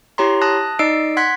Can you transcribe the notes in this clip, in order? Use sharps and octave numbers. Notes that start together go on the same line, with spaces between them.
E4 G4 C#5 A#5 C6
A5 D#6 F#6 A#6
D#4 D5 D#5 E6 C7 D7
F#5 C6 F#6 G#6 B6